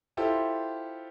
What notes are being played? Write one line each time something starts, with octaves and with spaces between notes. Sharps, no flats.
E4 F4 G4 A4 C5